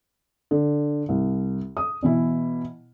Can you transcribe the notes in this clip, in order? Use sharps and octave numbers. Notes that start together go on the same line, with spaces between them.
D3
C2
D#6
B2 E3 E4